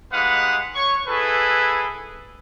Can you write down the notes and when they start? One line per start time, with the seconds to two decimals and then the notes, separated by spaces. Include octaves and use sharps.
0.12 G3 G#3 D#4 B4 F5 F#5
0.74 C#5 C#6
1.07 E4 G#4 A4 B4